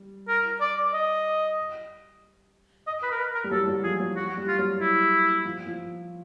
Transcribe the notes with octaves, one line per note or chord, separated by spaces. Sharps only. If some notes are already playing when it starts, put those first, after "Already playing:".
Already playing: G3
A#4
D5
D#5
D#5
B4
A#4
B4
A#4
G3
F#3 A4
F#3
F3 G#4
F#3
F#4
G3
F4
F#3
E4
F3
F3